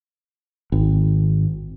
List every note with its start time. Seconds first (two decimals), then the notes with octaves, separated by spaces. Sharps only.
0.72 G#1